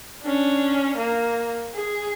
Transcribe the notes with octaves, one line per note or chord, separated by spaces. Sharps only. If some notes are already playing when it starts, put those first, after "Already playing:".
C#4 D4
A#3
G#4